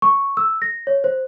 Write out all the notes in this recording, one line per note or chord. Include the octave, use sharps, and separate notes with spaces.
C#6
E6
A#6
C#5
C5